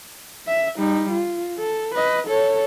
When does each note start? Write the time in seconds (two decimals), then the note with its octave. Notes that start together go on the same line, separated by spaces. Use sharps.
0.48 E5
0.78 G3 D#4
1.12 F4
1.57 A4
1.95 B4 D#5
2.28 A4 C#5